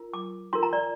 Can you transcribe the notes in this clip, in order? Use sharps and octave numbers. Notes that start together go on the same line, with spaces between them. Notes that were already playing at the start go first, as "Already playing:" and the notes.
Already playing: F4 A#4
D6
F4 A#4 C6
A#5
D5